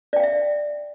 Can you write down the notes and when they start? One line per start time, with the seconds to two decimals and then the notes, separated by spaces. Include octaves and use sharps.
0.13 D5
0.16 G5
0.20 F5
0.23 E5